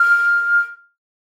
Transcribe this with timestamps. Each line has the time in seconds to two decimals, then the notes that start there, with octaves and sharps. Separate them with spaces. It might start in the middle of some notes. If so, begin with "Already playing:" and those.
Already playing: F6